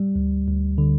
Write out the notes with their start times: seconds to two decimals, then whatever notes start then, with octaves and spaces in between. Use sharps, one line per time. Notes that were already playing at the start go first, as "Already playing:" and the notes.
Already playing: G3
0.15 D2
0.48 D2
0.78 D3